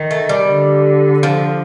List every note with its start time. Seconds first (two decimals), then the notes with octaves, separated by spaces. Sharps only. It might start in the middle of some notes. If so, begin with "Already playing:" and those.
Already playing: D#3
0.11 A3
0.29 G3
0.48 D3
1.23 F3